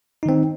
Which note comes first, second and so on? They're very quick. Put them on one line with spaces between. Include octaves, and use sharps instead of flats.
D#4 D#3 C4